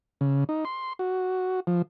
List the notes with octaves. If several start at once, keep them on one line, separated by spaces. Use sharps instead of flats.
C#3
D#4
C6
F#4
F3